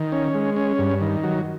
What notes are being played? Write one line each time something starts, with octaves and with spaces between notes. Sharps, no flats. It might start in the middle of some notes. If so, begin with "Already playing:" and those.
Already playing: D#3
C#4
G#3
C#4
G2
D#3
F#3